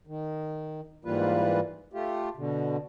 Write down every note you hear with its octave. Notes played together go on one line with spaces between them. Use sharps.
D#3
G#2 E3 G3 A#3 F4 B4
A3 F4 G4
B2 D3